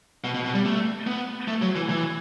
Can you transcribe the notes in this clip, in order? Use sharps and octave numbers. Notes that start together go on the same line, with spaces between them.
B2
B2
B2
G3
A3
B3
A3
F#3
E3
E3